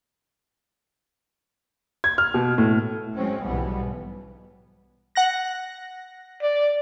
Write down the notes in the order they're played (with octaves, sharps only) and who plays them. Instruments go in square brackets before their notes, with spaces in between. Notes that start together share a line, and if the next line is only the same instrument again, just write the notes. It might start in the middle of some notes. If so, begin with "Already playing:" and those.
[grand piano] G#6
F6
B2
A2
[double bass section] F#3 G#3 C4 C#4
B1 G#2 B2 E3 G3 B3
[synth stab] F#5 F#6 A#6
[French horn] D5